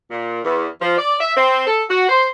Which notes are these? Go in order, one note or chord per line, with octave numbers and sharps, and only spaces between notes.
A#2
E2
F3
D5
E5
C4
A4
F#4
C5